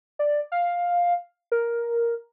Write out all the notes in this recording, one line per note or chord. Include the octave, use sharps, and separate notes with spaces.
D5
F5
A#4